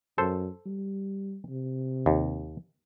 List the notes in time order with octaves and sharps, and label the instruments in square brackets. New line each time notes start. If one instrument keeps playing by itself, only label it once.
[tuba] F#2 [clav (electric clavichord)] A4 C5
[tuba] G3
C3
[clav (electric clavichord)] D#2